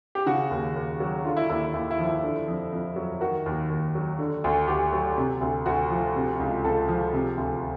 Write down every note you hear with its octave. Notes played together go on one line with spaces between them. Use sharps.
G4
C#3 F#4
D#2
D#2
F#3
D3 F4
E4
D#2 E4
D#2 E4
E4
F3
E4
D3
F2
F2
F#3
D#3 F#4
D#2
D#2
F#3
D3
D2
D2 G4
F#3
C3
D2
D2 F#4
F3
C3
C#2
C#2 A4
F3
C3
D2